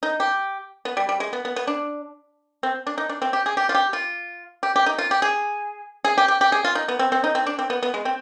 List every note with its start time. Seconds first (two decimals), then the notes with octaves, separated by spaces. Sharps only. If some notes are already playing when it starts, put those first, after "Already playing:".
0.03 D#4
0.20 G4
0.85 B3
0.97 G3
1.09 G3
1.20 G#3
1.33 B3
1.45 B3
1.56 B3
1.67 D4
2.63 C4
2.87 D4
2.98 D#4
3.09 D4
3.22 C4
3.33 G4
3.46 G#4
3.57 G4
3.69 F4
3.75 G4
3.93 F4
4.63 G4
4.76 G4
4.86 D#4
4.98 F4
5.11 G4
5.22 G#4
6.05 G#4
6.18 G4
6.28 G4
6.41 G4
6.52 G#4
6.64 F4
6.75 D#4
6.88 B3
6.99 C4
7.12 C4
7.24 D#4
7.35 C4
7.46 D4
7.59 C4
7.70 B3
7.82 B3
7.94 G#3
8.05 C4